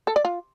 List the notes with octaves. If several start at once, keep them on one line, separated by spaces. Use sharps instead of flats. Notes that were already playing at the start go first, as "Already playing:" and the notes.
A4
D5
F4